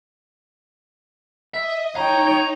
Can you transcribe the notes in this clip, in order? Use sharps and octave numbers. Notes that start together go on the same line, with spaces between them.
D#5 E5
D#4 C#5 G5 A#5